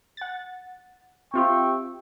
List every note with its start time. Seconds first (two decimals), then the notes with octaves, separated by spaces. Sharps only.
0.17 F#5 A6
1.34 C4 F4 G4 E5 G5 C#6